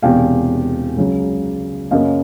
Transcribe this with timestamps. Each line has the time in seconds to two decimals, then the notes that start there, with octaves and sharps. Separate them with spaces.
0.02 E1 E2 C3 F5 G5
0.97 C#2 C#3 F#3
1.91 F#2 C#3 F#3 A#3 D#5 F5